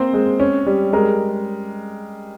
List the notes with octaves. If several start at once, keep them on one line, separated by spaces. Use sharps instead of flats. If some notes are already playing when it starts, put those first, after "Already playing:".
Already playing: A#3 C4 C5
G#3
C#4
G3
G#3 A#4